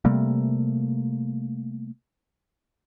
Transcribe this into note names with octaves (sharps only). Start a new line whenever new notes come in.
C3 G3 A3 A#3